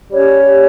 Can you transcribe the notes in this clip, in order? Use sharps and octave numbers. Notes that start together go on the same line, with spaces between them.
G3 C#4 G4 C#5